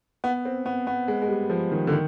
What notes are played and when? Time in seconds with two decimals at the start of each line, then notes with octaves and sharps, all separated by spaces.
0.24 B3
0.45 C4
0.66 B3
0.87 B3
1.08 G#3
1.22 G#3
1.28 G3
1.50 F3
1.72 D#3
1.87 D3
1.92 D#3